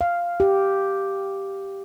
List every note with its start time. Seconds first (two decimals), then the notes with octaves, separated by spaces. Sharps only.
0.01 F5
0.40 G4